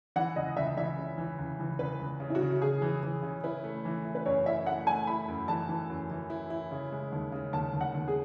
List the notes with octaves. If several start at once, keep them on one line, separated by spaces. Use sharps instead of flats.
E3 F#5
C#2 D#5
C#2 E5
E3 E5
C#3
E3
C#2
E3
C#2 B4
C#2
C#3
E4
F#4
C#3
C#3 G#4
E3
E3
C#3
E4 B4
A3
E3
E4
B4
F#2 C#5
E4 E5
A3 F#5
A3 G#5
E4 B5
F#2
E3 A5
E3
F#2
E3
E4
E4
C#3
G#3
D#2
C#3
D#2 A5
D#2
F#5
D#2
G#4